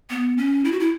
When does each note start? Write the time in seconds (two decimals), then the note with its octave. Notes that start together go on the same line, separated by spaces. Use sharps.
0.10 B3
0.38 C#4
0.65 E4
0.72 F#4
0.80 E4